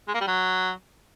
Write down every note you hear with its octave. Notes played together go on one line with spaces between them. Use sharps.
G#3
A#3
G3
F#3